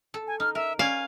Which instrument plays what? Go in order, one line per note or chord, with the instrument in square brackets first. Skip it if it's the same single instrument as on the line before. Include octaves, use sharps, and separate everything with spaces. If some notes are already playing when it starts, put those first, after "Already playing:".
[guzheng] A4
[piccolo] G#5
[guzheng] D#4 [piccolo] F6
[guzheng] A#4 [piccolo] E5
[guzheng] C#4 D5 [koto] F5 [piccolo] G#5